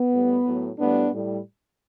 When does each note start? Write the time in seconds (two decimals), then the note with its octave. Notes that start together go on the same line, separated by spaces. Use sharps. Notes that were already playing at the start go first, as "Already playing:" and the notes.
Already playing: B3
0.12 A2 G3
0.45 A2 F#3
0.79 A2 G3 B3 D4
1.13 A2 G3